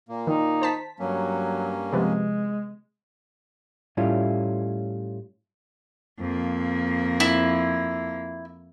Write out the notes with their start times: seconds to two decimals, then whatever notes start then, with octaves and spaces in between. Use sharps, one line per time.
0.09 A#2 A#3
0.27 D#3 D#4
0.62 C5 A5 B6
1.00 G2 F#3 A#3 C#4
1.93 C3 F3 G#3 B3
3.97 A2 G3 A3 C#4 E4 F4
6.20 F2 A#3
7.20 E4